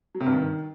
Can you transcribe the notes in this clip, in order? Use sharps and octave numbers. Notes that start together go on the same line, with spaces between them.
F#3
C3
G2
D#3